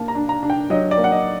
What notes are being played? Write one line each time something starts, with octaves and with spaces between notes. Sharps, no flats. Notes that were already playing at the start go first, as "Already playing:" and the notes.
Already playing: A#3 D4 A5
A#5
D4
A#5
D4
G5
F#3 D#5
D5
A#3
F#5
D#5